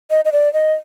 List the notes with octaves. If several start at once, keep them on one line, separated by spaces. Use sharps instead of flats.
D#5
D#5
D5
D#5